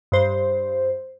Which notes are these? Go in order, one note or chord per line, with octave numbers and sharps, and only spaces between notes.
G2 C5